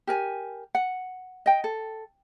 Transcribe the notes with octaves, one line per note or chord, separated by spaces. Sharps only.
G4 A#4 G#5
F#5
D#5 G5
A4